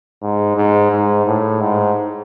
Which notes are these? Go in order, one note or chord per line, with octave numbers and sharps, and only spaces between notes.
G#2
G#2
G#2
A2
G#2